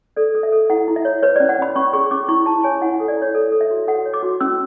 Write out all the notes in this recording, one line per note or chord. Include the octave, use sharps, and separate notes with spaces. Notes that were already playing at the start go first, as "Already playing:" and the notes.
A4 D5
A4
E5
A4
E4 F#5
E4
E5
C#5
B4 C#5
C#4 D5
F#5
C#4 B5
C#4 C#6
G#4 C#6
C#4 D6
E4 C#6
E4 A5
C#5 G#5
E4 F#5
F#5
A4
D5
E4 C#5
A4 D5
A4
E5
F#4
A4 F#5
C#5
D6
F#4
C#4 E6